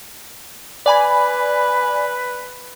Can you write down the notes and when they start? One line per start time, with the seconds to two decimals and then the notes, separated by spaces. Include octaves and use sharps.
0.86 B4 D5 G#5 B5